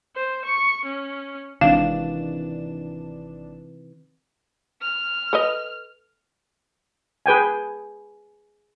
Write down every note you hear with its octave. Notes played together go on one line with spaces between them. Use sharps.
C5
C#6
C#4
G#1 C3 D#3 E3 D4 F5 E7
F6
A4 B4 D#5
G#4 B4 G5 G#5